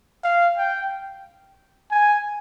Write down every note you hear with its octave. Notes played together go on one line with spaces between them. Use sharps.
F5
G5
G#5